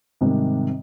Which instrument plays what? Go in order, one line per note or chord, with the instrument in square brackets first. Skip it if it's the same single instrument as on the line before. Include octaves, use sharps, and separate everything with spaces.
[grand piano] G#2 C3 D#3 G3